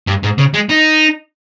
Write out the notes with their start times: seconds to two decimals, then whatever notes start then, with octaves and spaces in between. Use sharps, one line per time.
0.08 G2
0.24 G#2
0.39 C#3
0.55 G#3
0.70 D#4